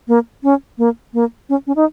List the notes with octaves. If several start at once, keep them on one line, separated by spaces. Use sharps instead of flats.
A#3
C#4
A#3
A#3
C#4
C#4
D#4